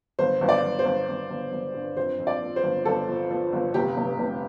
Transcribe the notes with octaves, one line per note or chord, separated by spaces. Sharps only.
G1 C5
G1
D5
G1
C5
G1
G1
G1
G1
G2
F2 C5
F2
D5
F3
C5
G1
G1 A4
F3
F3
G1
F1 G4
F1
F1